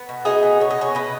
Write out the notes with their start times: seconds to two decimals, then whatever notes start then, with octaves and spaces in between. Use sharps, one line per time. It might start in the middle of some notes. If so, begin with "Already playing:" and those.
Already playing: B3
0.09 B2
0.25 B2 D#4 G#4
0.43 B3
0.60 B2 C#5
0.71 D#5
0.78 B2 G#4 C#5
0.95 B2 B4 D#5